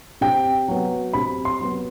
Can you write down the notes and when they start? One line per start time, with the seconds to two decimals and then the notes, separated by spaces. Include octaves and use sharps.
0.21 C3 G5
0.68 F#3 B3
1.13 C3 B5
1.45 C6
1.60 F#3 B3